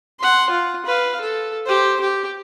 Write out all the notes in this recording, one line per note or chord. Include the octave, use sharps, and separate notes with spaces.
F#5 C6
F4
B4 F5
A4
G4 C5
G4